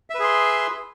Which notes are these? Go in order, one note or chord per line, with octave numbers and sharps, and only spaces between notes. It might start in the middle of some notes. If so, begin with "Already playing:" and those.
G#4 B4 E5 C6